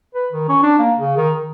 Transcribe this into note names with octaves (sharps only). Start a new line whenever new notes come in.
B4
D#3
C#4
D4
A#3
C#3
D#3
D#3